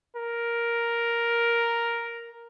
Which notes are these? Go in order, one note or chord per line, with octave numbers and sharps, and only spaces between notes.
A#4